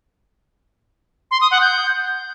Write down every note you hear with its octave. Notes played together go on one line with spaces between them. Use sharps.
C6
D#6
F#5
G6